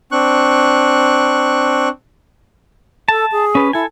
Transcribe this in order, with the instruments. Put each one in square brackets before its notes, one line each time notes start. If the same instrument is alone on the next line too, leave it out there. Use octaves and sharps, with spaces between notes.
[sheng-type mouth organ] C4 D4 C#6 F#6
[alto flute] A4 [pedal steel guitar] A5
[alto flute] G#4
[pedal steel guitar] C#4 B4
[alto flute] E4 [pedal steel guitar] A4 G#5